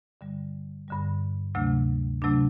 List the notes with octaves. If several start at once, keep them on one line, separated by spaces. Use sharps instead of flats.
G2 D3 G3
G2 D3 G3
D2 C3 F#3 A3 D4
C3 F#3 A3 D4